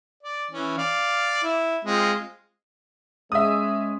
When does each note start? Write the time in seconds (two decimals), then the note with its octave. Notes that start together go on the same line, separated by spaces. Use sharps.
0.23 D5
0.51 E3 C#4
0.78 D5 F5
1.44 E4
1.85 G#3 C4 F4
3.32 G#3 C#4 E5 D#6